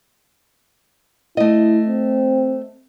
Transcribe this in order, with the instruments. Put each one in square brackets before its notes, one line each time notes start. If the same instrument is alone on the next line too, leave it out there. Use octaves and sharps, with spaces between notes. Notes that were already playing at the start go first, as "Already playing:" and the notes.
[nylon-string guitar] A3 D#5 [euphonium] E4
[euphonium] C4